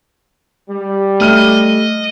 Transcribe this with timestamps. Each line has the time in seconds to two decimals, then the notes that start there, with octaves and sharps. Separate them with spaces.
0.67 G3
1.20 A3 D#5 F6 D#7